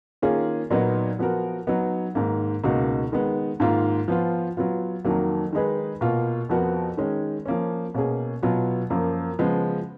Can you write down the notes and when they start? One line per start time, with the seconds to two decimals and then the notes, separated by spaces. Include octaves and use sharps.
0.22 D#3 A#3 C#4 F4 G#4
0.70 A#2 F#3 B3 D#4
1.19 F3 B3 F#4 A#4
1.67 F#3 B3 D#4
2.15 G#2 D#3 A#3
2.64 C#2 B2 A#3 D#4 F#4
3.12 D#3 G#3 B3
3.60 G#2 D#3 A#3 F4
4.08 F3 B3 F4
4.57 F#3 B3 F4
5.04 F2 D#3 F#3 A#3
5.53 D#3 G#3 D#4 G#4 B4
6.01 B2 A#3 F4
6.49 F2 F3 B3 F#4 A#4
6.97 D#3 G#3 C#4
7.46 F3 A#3 C#4
7.94 B2 A#3 C#4 G#4
8.43 B2 F#3 B3 F4
8.90 F#2 F3 A#3
9.39 C#3 F3 G#3 B3